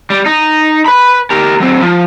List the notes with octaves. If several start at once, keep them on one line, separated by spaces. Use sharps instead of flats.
G3
D#4
B4 B5
G4 A#4
F#3 C4
F3